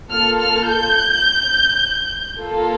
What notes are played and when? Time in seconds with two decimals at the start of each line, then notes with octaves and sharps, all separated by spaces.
0.11 A#3 F4 A4 F6
0.40 F6
0.69 G6
2.39 A#3 F4 A4